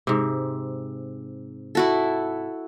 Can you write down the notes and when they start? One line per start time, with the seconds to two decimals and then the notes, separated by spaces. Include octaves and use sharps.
0.07 G#2 C3
1.75 E4 F#4 A4